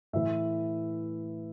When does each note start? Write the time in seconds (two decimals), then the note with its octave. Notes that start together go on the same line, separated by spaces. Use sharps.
0.13 A2 E3 E5